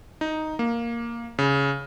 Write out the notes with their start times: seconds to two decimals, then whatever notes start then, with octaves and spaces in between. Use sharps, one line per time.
0.21 D#4
0.59 A#3
1.39 C#3